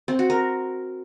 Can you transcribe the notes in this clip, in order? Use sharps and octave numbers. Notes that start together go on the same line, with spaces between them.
C4
F#4
A#4